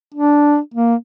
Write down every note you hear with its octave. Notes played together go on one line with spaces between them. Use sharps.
D4
A#3